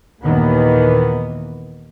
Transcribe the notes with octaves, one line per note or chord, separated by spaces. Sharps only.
D#2 A#2 D#3 E3 B3